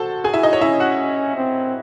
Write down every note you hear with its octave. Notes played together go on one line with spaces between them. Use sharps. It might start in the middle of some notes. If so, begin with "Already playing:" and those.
Already playing: F#4 A4 C5 A5
G#4 G#5
E4 E5
D#4 D#5
C#5
C#4 E4 E5
F#4 F#5
C4